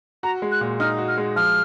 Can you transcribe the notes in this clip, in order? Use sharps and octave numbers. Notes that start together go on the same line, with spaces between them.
F#4 A#5
G#3
F#6
A#2
D#4 F6
F#4
F6
G#3
F3 F6